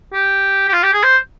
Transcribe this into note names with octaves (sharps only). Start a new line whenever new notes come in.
G4
G4
F4
G4
G#4
C5